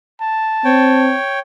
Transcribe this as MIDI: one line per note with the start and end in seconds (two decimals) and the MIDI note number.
0.20 1.10 81
0.65 1.17 60
0.65 1.39 73
0.65 1.39 79